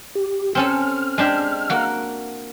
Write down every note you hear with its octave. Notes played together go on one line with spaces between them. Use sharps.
G4
C4 C#4 A4 F6
G#3 D4 G4
A#3 F#4